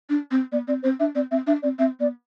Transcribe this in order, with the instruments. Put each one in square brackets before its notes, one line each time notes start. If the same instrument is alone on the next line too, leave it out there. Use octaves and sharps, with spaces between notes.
[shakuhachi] D4
C4
[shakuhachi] B3 [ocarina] D5
[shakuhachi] C4 [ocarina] D5
[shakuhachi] C4 [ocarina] C5
[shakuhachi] D4 [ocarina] E5
[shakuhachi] C4 [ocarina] D5
[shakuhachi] C4 [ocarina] E5
[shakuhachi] D4 [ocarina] E5
[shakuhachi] C4 [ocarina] D5
[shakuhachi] C4 [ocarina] E5
[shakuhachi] B3 [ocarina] D5